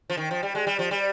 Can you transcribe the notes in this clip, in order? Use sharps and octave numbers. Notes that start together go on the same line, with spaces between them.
F3
D#3
F3
G3
G#3
G3
F3
G3